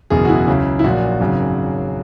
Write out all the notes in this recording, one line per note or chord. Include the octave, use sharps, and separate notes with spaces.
F#1 E2 B2 G#4
F#4
E4
C#2 C#3 F#3
E4
A#1 A#2 F#3 F#4
G#1 F#2 C#3 F#3